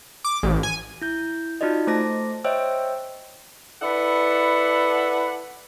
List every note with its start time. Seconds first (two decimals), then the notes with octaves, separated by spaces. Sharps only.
0.24 D6
0.43 A1
0.63 G#5
1.01 E4 G6
1.61 D#4 F4 F#4 D5 D#5
1.87 A3 C5 A5 D6 A#6
2.44 C5 C#5 D#5 E5 G5 E6
3.82 E4 A4 B4 D5 F#5